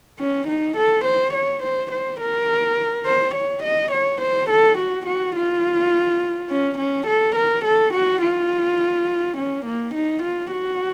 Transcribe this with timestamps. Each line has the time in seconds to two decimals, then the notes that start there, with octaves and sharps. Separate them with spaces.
0.19 C#4
0.48 D#4
0.77 A4
1.05 C5
1.34 C#5
1.63 C5
1.92 C5
2.20 A#4
3.06 C5
3.35 C#5
3.63 D#5
3.91 C#5
4.21 C5
4.50 A4
4.78 F#4
5.06 F#4
5.36 F4
6.50 C#4
6.78 C#4
7.07 A4
7.36 A#4
7.65 A4
7.94 F#4
8.22 F4
9.37 C#4
9.66 A#3
9.95 D#4
10.23 F4
10.51 F#4